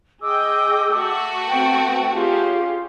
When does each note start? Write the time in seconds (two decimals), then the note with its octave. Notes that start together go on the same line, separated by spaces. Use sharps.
0.23 G#4 D#5 G5 D6 E6
0.91 A3 F#4
1.49 B3 C4 G5 C6
2.15 C#4 F4 G4 G#4